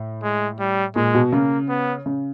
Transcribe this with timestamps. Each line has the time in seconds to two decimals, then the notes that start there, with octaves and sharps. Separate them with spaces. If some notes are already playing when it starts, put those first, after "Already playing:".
Already playing: A2
0.23 G#3
0.59 G3
0.96 A#2 G#3
1.14 B2
1.32 C#3 A#3
1.69 B3
2.06 C#3